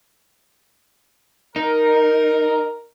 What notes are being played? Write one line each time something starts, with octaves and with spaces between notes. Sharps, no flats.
D#4 A#4